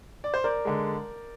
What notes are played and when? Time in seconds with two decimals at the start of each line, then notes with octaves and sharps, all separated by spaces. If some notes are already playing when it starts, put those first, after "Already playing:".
0.24 D5
0.34 C5
0.44 A#4 D5
0.65 D3 G#3